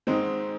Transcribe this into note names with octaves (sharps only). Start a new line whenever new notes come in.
G#2 D#3 G#3 C4 D#4